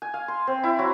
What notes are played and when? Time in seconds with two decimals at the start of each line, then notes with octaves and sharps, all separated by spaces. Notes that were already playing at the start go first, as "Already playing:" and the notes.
0.02 G#5
0.14 F5
0.28 C6
0.47 C4
0.64 E4
0.79 F#3